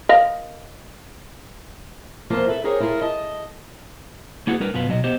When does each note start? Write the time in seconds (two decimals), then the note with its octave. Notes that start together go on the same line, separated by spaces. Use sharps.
0.09 A#4 D#5 F5
2.30 E2 F3 A#3 F4 C5 A5
2.48 A4 B4 E5
2.64 G4 G#4 A#4 C5 C#5
2.80 E4 F4 A4 A#4
3.01 D#5 A5
4.47 A#3 E4 F#4 G#4 A4 B4
4.60 G3 D4 A#4 B4
4.73 F#2 B2 F4 F#4 B4
4.87 B2 F#3 D#5
5.04 B3 G4 C5 D#5